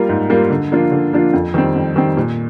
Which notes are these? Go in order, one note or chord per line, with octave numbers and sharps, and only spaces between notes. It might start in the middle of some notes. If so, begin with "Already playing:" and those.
Already playing: G3 A#3 F4 A#4
G#2
G3 A#3 F4 A#4
D3
F3 A#3 D4 F4
D3
F3 A#3 D4 F4
F2
D#3 G3 C4
F2
D#3 G3 C4
A#2